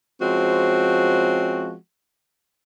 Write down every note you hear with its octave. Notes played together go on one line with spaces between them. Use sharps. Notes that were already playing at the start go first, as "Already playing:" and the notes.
F3 G#3 C4 C#4 F#4